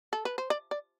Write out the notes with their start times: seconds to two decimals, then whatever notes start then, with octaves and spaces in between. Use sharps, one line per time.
0.13 A4
0.25 B4
0.38 C5
0.50 D5
0.71 D5